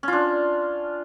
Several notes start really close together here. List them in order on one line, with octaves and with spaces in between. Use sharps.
C#4 F4 D4